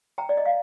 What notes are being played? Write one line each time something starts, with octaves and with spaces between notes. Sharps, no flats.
G5 A#5
D5
D#5
F5